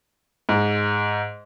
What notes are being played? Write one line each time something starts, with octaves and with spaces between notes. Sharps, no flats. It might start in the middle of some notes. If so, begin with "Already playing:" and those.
G#2